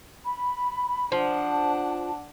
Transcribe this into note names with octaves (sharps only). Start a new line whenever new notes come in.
B5
F3 D4 F#5 A5